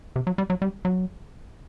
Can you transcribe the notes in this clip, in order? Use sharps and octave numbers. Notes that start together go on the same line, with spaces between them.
C3
F#3
G3
F#3
G3
F#3